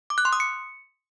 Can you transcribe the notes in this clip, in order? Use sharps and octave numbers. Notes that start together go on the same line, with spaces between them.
D6
F#6
C6
D#6
C#7